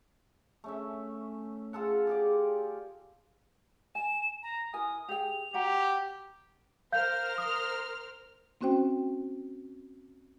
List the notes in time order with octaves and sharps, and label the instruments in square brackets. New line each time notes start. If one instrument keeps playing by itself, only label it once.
[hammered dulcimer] A3 C#4 E5
F4 G#4 A4 F#5
G4 G#4 D5
[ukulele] G#5 [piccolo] E7
[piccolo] A#5
[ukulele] E4 A#4 G#5 [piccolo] D#6
[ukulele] G4 G#4 G5 [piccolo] F7
[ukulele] F#4 F#5 A#5 [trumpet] G4
[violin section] A#4 C5 F6 [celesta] F5 G6
[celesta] D#6
[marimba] A#3 C4 C#4 F#4 C5 G5